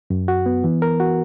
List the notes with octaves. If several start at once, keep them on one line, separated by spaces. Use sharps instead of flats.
F#2
F#4
B3
E3
A#4
F#4